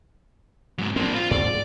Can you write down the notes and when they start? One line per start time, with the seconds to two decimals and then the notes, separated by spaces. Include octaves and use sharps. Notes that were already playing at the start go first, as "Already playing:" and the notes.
0.79 G#2 F#3
0.96 A#3 C4 D4
1.15 F4
1.31 G#2 D5